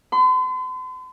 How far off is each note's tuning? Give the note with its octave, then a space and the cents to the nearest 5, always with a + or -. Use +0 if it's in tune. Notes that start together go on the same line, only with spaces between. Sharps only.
C6 -45